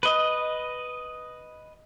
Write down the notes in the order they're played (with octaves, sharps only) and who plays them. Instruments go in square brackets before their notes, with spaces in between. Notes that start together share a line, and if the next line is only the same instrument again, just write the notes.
[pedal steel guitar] B4 D#5